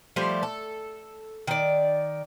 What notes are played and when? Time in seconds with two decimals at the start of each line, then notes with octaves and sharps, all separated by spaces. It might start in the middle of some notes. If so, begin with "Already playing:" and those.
0.16 F3 G3 A3 C5
0.43 A4
1.47 D#3 D5